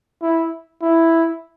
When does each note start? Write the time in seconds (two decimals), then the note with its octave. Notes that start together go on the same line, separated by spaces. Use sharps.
0.22 E4
0.82 E4